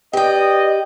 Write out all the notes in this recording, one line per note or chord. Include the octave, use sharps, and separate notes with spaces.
G4 B4 D5 D#5 G5